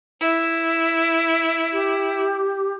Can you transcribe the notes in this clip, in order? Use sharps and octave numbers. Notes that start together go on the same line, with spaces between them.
E4
G4